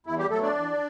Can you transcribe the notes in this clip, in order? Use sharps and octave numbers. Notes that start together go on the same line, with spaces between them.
E2 E4
G3 G4
B2 F#3 A3 A4
D4 D5
E2